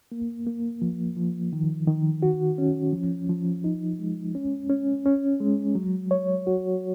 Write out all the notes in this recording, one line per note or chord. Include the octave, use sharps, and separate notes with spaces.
A#3
A#3
F3
F3
D#3
D#3
F#4
C#4
F3
F3
D#4
G#3
C#4
C#4
C#4
G#3
F#3
C#5
F#4